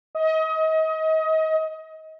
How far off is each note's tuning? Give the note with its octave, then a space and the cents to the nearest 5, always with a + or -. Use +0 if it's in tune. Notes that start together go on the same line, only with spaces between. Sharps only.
D#5 +30